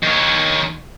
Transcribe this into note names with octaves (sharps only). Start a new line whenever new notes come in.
D#3 C#5